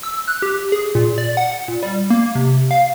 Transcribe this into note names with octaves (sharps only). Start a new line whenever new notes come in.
E6
F#6
G4
G#4
A#2
D5
F#5
A#2
G3
A#3
C3
F5